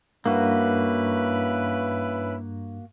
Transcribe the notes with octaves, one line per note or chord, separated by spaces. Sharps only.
G2 A#3 C#4 E4 F#4 B4